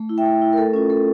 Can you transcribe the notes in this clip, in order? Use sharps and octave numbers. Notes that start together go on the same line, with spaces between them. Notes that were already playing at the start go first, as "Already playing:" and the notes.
Already playing: A3
E4
E5 G5
A3
E4
A#4
A3 A4
C#4 F4 A4
A3 A4